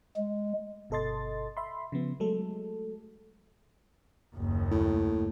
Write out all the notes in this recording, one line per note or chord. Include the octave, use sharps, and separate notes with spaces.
G#3
G1 B2 A4 D#5 C6 A6
E5 B5 C6
C#3 F3 B3
F#3 G#3 A3 A4
F#1 D#2
A2